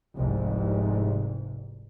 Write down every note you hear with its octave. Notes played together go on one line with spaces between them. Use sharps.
F1 C2 G#2